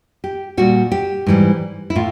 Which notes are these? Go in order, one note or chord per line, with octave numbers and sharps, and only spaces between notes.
G4
A#2 G3 F#4
G4
G#2 E3 G3
E4
A2 F4